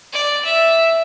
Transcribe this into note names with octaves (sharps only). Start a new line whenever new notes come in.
D5
E5